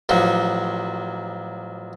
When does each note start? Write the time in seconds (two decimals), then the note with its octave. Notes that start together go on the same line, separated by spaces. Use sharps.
0.09 A1 F3 F#3